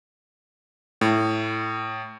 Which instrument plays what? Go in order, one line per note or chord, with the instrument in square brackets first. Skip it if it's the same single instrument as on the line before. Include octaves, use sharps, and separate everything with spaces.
[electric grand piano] A2